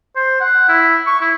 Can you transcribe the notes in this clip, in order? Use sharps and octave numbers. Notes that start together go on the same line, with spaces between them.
C5
F#5
E4
C#6
E4